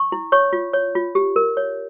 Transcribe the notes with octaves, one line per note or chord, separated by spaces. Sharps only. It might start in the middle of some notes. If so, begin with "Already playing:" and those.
Already playing: C#6
E4
C#5 C#6
F4
C#5
F4
G4
A#4
C#5